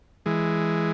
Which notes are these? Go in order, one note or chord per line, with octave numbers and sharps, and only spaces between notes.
E3 G#3